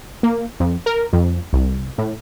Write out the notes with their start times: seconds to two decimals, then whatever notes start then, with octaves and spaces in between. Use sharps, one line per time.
0.23 A#3
0.60 F2
0.86 A#4
1.13 F2
1.53 C2
1.98 A2